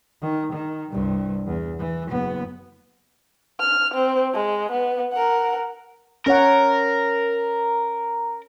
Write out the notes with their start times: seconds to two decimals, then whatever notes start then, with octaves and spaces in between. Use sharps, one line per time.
0.22 D#3
0.52 D#3
0.92 C2 G2
1.46 E2
1.79 E3
2.09 F#1 B3
3.60 F6
3.94 C4
4.34 G#3
4.71 B3
5.13 A#4 F#5
6.26 C#4 A#4 C#5 F#5